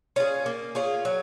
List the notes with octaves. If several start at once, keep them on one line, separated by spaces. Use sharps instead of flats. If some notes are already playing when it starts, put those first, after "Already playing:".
C#4 F4 G#4
A#3
C#4 F4 G#4
F#3